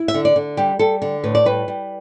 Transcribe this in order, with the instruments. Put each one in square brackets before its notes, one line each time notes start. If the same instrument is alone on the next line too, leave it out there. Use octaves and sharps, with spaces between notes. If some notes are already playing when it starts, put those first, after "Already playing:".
Already playing: [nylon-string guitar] E4
E5
D3
D5
D3
G3 G4
G3 A4
D3
A2 B4
D5
G3 B4
G3